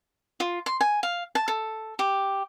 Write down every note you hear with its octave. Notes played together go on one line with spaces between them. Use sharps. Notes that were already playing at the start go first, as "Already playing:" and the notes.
F4
C6
G#5
F5
A5
A4
G4